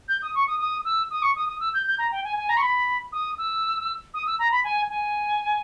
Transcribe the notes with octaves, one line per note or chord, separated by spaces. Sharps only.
G6
D#6
C#6
D#6
D#6
E6
D#6
C#6
D#6
D#6
E6
G6
G6
A#5
G5
G#5
G#5
A#5
C#6
B5
D#6
E6
D#6
E6
A#5
B5
G#5
G#5